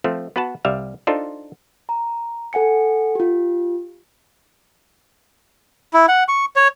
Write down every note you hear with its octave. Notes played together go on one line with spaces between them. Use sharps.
F3 A3 C4
B3 F#4 B4 F#5 A5
C2 G3 E5 F5
D4 D#4 F4 A4 C5
A#5
A4 F#5 G#5 C#7
F4 G4
E4
F#5
C#6
C#5